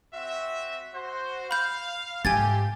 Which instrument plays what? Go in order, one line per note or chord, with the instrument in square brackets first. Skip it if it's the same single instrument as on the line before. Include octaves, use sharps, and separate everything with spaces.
[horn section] C4 F#4 E5
F#4 C5
[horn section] F5 [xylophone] B5 G6
[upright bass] G#2 [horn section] F3 A3 G4 [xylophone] G#5 G#6 A6